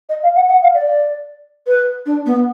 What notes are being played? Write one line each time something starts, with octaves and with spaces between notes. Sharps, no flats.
D#5
F5
F#5
F#5
F5
D5
B4
D4
B3